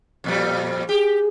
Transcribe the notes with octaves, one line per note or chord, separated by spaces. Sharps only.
F2 A#2 G3
G4 G#4